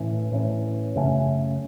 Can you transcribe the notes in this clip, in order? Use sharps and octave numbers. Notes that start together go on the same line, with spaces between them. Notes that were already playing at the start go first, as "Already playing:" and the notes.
Already playing: A2 E3 C#4
A2 E3 C#4
F#2 C#3 A3 C#4